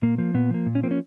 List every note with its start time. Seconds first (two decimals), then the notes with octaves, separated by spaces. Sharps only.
0.02 A#2 A#3
0.18 F3 A#3
0.34 A#2 B3
0.50 F3 A#3
0.66 A#2
0.75 C#4
0.83 F3 A#3 C4
0.91 C#4